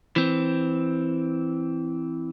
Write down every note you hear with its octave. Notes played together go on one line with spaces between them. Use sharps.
E3 C4